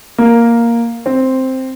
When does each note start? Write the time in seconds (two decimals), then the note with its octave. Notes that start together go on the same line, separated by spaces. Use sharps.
0.18 A#3
1.06 C4